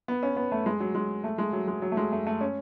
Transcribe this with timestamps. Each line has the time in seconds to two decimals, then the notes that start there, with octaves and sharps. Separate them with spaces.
0.08 B3
0.23 C#4
0.36 B3
0.52 A3
0.66 G#3
0.80 F#3
0.95 G#3
1.24 A3
1.38 G#3
1.53 F#3
1.67 G#3
1.82 F#3
1.92 A3
1.97 G#3
2.12 A3
2.27 A3
2.41 C#4